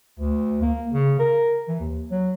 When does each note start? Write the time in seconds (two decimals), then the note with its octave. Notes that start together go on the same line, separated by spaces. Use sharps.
0.19 D2
0.62 A#3
0.91 C#3
1.19 A#4
1.68 E3
1.79 D#2
2.11 F#3